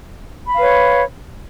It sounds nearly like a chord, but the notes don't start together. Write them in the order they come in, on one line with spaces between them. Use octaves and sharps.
B5 F5 B4 C#5